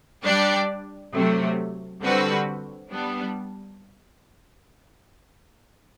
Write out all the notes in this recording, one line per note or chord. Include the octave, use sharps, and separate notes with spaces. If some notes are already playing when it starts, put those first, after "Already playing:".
G3 D4 G4 D5
C3 F#3 A3
D3 G3 C4 F#4 B4
G3 B3 D4